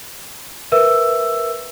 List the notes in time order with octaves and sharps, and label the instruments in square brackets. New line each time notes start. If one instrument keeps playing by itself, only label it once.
[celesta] A#4 B4 E5 E6